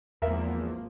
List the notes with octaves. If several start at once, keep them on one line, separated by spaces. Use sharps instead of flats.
G#1 E2 F3 A#3 A#4 E5